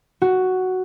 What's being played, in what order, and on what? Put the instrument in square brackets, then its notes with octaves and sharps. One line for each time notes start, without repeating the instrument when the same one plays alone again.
[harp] F#4